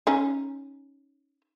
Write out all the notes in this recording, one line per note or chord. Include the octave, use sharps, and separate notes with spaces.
C#4 D#4